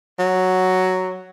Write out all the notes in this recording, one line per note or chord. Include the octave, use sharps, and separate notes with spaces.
F#3